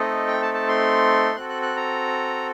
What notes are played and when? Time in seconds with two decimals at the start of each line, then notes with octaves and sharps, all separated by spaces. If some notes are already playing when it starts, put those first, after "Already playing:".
Already playing: A3 C4 D#4 A4 D#5
0.27 G5
0.42 A5
0.54 A5
0.68 C6
1.35 C4 F#4 A4 F#6
1.49 F#6
1.62 F#6
1.76 A#5